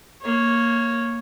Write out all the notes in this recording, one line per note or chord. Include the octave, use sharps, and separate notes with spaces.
A#3 C#5